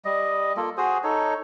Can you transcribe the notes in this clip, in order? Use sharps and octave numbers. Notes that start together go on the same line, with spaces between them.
G3 D#5
A#3 F4 A4
F#4 G#4 C5 D#6
D#4 A4 C#5